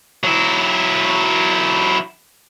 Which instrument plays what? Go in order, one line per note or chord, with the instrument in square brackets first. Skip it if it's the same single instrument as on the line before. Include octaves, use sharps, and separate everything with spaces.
[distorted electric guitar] F#3 E4